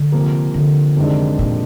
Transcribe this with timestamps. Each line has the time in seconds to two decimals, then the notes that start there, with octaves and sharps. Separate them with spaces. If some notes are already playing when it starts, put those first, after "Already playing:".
Already playing: D3
0.12 C3 F3 A#3
0.54 D3
0.97 F2 C3 D#3 G#3 D4
1.39 A#2